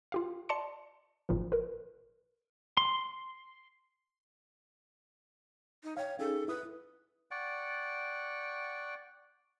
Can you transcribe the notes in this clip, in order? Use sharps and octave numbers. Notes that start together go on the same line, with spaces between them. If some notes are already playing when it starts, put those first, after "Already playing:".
F4 G4 F5
D5 A5 C6 C#7
G#1 A#2 F3
A#4 B4
C6
D#4
C#5 F5 G5
C#4 D#4 G#4 A4
E4 B4 D#6
D5 F#5 G5 C#6